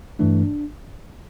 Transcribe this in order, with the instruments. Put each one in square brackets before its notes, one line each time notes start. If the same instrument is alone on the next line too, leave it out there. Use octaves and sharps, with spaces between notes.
[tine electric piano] G2 E3 A3 D4